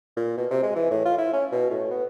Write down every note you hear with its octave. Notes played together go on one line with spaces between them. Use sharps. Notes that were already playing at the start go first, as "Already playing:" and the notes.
A#2
B2
C3
G#3
E3
A2
F4
E4
C#4
B2
A2
B3